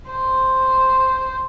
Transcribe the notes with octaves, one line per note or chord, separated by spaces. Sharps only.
C5